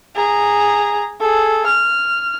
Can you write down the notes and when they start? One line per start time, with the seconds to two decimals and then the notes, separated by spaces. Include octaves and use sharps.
0.16 G#4 A#5
1.20 G#4 A4
1.67 F6